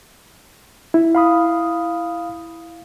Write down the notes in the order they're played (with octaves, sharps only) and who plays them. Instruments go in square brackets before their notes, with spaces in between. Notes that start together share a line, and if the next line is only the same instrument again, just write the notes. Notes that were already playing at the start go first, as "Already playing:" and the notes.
[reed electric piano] E4
[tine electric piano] F5 B5 D#6